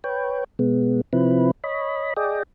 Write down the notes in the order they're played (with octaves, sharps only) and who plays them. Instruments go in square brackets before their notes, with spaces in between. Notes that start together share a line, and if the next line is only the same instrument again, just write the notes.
[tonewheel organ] B4 C#5 G5
B2 G#3 B3
C3 F3 C4 E4 B4
C#5 D#5 B5
G#4 D5 D#5 G5